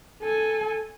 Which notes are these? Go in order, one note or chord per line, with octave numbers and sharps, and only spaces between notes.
A4 G#5